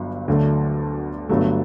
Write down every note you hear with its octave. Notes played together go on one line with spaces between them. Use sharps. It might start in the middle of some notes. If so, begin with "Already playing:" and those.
Already playing: G1 G2 F#3
D2 D3 F#3 A3 D4
G1 G2 F#3 A3